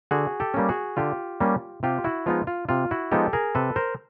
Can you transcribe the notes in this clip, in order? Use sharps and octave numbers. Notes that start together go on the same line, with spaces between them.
D3 F#4 G#4
G4 A4
G3 A#3 C#4
F#4 G#4
D3 F4 G4
G3 A#3 C#4
C3 F4 G4
E4 F#4
F3 G#3 B3 D#4 F4
F4
C3 F4
E4 F#4
F3 G#3 B3 D#4 G4 A4
G#4 A#4
C3 A4 B4
A#4 C5